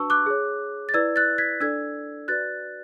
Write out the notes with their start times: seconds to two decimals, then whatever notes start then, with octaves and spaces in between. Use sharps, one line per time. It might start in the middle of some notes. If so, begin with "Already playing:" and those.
Already playing: D4 F#4 B4 A5 C#6 E6
0.10 D6 F#6
0.26 G#4 C#5
0.89 A6
0.94 E4 B4 D5 E6 G#6
1.16 F#6 A6
1.38 G#6 B6
1.61 D4 A4 D5 E6 G#6
2.28 F#4 B4 D5 F#6 A6